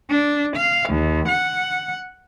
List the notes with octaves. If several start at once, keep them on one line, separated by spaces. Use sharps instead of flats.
D4
F5
D#2
F#5